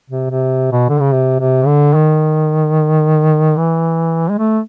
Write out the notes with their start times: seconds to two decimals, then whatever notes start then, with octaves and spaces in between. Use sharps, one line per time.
0.10 C3
0.30 C3
0.72 B2
0.89 D3
1.00 C#3
1.13 C3
1.40 C3
1.66 D3
1.94 D#3
3.57 E3
4.30 G#3
4.38 A3